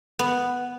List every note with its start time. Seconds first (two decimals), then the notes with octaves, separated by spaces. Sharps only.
0.19 B3